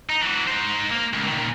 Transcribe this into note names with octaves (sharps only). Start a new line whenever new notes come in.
D#4
E3 F#4
D#4 C5
A#3
C#2
A#2 D#3